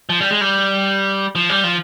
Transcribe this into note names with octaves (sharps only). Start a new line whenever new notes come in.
F3
G3
G#3
G3
F3
G3
F3